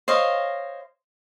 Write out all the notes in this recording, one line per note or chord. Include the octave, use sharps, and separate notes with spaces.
C5 C#5 D#5 F5